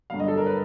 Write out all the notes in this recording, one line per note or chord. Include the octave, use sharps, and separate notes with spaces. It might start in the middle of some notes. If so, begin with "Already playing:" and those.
G2 D3 F#3 F5
D#5
A4
A#4
B4